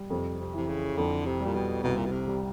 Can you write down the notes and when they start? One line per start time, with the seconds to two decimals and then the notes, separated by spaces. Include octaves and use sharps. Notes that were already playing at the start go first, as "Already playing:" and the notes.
Already playing: G3
0.10 F2 C3
0.39 C3
0.54 C3 E3
0.68 C#3
0.97 F2 D3
1.26 C3
1.40 G3
1.46 A#2
1.54 B2
1.83 C2 B2
1.97 A#2
2.06 B2
2.12 C3
2.27 G3